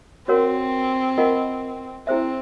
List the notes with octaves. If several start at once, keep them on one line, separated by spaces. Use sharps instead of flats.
C4 F#4 A#4 C#5 F#5
F4 A#4 D#5 F#5
C4 E4 G#4 C5 E5